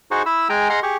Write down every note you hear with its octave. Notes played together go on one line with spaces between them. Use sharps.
D#4 F#4 G#4 C5 C#6
E4 B5 E6
G#3 G#4 G5 G#5 A#5
G#4 D#5 F#5 A#5 C6 F6
G4 G#4 C#6